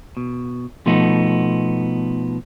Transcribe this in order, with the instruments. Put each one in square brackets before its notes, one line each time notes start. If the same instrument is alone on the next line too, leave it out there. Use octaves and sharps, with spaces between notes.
[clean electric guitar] B2
B2 F3 A3 B3 D#4